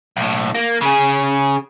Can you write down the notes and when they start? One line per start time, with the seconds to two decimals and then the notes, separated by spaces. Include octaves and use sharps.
0.17 B1 A2
0.55 A#3
0.82 C#3 G#4